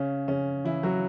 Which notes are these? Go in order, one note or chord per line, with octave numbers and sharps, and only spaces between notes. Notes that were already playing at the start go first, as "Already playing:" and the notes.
Already playing: C#3 C#4
C#3 C#4
E3 E4
F#3 F#4